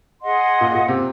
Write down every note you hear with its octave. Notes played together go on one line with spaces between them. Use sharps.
G#4 D#5 F#5 C6
A#2
A#2
C3